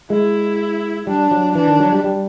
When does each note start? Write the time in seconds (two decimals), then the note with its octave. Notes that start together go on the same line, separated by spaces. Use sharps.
0.10 G#3 E4
1.07 G3 D4
1.31 F#3
1.55 E3 D4
1.67 D#3
1.79 F#3
1.93 G3
2.04 G3